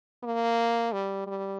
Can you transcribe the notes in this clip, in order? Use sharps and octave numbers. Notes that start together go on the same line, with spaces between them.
A#3
G3
G3